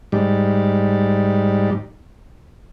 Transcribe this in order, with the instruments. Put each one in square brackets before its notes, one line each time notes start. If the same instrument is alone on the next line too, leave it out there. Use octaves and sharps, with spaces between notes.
[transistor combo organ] G#2 G3